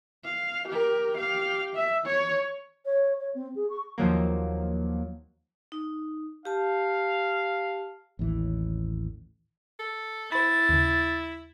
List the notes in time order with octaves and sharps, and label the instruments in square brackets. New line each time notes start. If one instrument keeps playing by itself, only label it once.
[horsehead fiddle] F5
G4 A#4
G4 F5
E5
C#5
[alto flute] C#5
C#5
C4
G#4
C#6
[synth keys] D#2 F3 F#3 A#3
[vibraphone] D#4
[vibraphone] G4 A5 [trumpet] F5
[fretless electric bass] A1 D#2 E3
[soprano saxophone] A4
[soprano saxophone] E4 [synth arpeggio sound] C5 B5 [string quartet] A6
[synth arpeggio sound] D#2 C#3